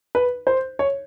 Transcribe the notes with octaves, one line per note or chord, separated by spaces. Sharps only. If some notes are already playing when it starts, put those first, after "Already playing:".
B4
C5
C#5